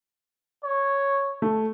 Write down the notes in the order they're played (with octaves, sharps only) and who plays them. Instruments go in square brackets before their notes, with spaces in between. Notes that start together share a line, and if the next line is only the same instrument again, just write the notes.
[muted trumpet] C#5
[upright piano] A3